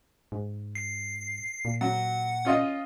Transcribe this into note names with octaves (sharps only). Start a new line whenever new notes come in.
G#2
C7
A#2
F#3 F#5
C#4 F4 D#5